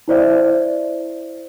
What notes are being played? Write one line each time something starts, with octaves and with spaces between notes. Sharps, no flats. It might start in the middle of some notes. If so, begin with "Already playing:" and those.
E4 C5 D5 E5